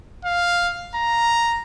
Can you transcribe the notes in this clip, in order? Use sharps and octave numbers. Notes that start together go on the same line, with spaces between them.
F5
A#5